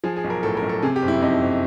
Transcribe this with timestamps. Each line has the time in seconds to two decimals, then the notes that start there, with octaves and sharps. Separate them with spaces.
0.04 F3 G#4
0.16 G#4
0.24 B1
0.30 A#4
0.43 A2 A4
0.57 A#4
0.62 B1
0.69 A4
0.82 C3 G#4
0.96 G4
1.02 F#1
1.08 E4
1.21 F2 D#4
1.41 F#1